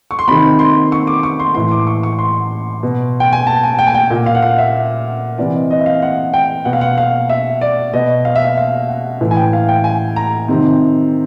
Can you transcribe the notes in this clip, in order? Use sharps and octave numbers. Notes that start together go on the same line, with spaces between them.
C#6
C6
C3 D#3 B5
C6
C#6
D6
C#6
C6
A2 E3 C6
D6
C#6
C#6
C6
B2
G5
G#5
A5
G#5
G5
G#5
G5
A#2
F5
F#5
F5
E5
C3 E3 D5
D#5
D#5
E5
F5
F#5
G5
B2 F#5
F5
F#5
F5
E5
D5
B2 D#5
F5
E5
F5
F5
F#5
A2 E3
G#5
G5
F5
G5
G#5
A#5
C3 D#3